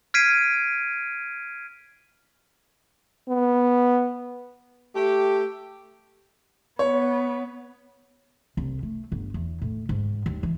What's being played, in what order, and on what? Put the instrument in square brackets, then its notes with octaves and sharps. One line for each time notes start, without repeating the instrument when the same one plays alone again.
[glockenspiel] F6 G#6 B6 C7 D7 D#7
[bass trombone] B3
[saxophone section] A3 G4
[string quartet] B3 [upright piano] C#5
[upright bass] C2
A3
G1
E2
A2
G#2
D#2
E3